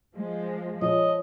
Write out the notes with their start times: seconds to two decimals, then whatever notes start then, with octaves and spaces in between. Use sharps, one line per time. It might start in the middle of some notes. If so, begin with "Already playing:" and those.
0.16 F3 G#3
0.82 F3 C#5 D#5